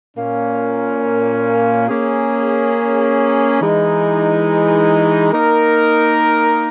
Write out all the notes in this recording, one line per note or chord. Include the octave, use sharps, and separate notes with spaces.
A#2 A#3 C#4
A#3 C#4 G#4
E3 G#3 D#4
A#3 D#4 A#4